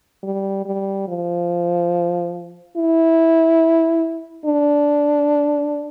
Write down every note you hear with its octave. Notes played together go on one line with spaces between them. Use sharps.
G3
G3
F3
E4
D4